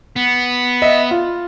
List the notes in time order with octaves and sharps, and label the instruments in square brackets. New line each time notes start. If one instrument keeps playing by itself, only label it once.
[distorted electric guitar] B3
[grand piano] D#5 E5
F4